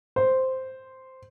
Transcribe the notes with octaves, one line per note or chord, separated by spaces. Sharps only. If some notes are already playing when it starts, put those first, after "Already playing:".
C5